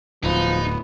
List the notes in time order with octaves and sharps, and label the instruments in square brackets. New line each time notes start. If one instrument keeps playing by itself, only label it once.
[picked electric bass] D1 [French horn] F3 [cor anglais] B3 [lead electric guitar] D#4